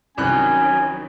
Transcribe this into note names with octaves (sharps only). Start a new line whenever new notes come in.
C2 D#3 F#3 C#4 G#5 F#6